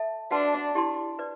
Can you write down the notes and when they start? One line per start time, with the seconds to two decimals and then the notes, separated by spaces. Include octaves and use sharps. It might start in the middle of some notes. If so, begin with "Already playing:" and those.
Already playing: A4 E5 A5
0.31 D4 F#4 B4 F#5 A5 C6
0.75 E4 G4 D5 A5 C6
1.19 B4 D5